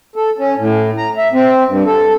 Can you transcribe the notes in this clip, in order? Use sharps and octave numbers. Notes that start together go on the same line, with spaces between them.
A4
C#4
A2
A#5
E5
C4
G2
A4